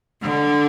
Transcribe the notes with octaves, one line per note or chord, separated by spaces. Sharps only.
D3